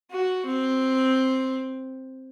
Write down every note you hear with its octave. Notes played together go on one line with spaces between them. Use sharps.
F#4
C4